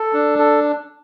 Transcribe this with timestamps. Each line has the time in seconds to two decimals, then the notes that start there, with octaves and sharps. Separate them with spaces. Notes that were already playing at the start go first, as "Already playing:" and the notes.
Already playing: A4
0.13 D4
0.39 A4